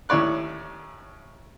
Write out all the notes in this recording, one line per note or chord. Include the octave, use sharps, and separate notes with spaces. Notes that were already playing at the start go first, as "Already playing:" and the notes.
D#2 A2 C#4 C#5 D5 F#6